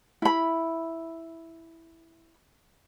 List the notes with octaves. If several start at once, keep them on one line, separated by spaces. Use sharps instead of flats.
E4 B5